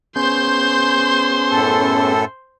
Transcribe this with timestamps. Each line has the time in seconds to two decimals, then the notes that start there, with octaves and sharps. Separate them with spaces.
0.16 B3 C#4 G#4 C5 C6 G6
1.50 F#2 A2 A4